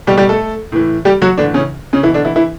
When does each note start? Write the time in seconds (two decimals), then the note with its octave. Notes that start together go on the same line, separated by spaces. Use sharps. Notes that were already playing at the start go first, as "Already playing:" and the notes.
0.07 B2 G3 G4
0.17 G3 G4
0.29 A3 A4
0.72 A2 E3
1.05 G3 G4
1.22 F#3 F#4
1.38 A2 D3 E3 D4
1.54 C#3 C#4
1.93 C#3 C#4
2.03 B2 E3 E4
2.14 D3 D4
2.25 E3 E4
2.36 E3 E4